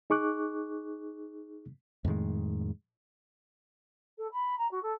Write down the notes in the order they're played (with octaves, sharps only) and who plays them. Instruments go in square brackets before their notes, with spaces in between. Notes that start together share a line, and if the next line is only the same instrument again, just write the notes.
[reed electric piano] D#4 G#4 C#6 D6 F#6
[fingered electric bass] F2 A2 D#3 G#3
[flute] A4
B5
A#5
F#4
A4